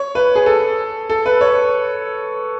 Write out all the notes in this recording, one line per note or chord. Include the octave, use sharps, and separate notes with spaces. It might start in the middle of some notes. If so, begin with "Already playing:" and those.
Already playing: C#5
B4
G#4
A4
A4
B4
C#5